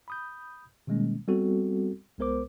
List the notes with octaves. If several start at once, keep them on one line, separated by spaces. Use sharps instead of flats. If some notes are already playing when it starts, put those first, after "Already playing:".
B5 D#6 G6
B2 D#3 G3 G#3 A#3 C#4
G3 B3 C4 F#4 A4
C2 G#3 B3 A#4 C5 D6